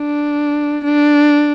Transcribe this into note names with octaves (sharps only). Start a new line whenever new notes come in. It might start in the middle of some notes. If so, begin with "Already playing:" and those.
Already playing: D4
D4